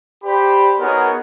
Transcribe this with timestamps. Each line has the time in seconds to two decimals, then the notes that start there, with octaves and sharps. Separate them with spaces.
0.24 G4 C5 D5 B5
0.79 B3 D#4 F#4 G#4 A#4 C#5